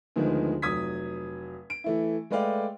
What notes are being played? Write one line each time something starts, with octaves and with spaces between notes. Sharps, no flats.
D2 D#3 F3 G#3 B3
F1 F#3 D#6 G#6 B6
D7
E3 A3 E4
G#3 A3 B4 D5 F5 G5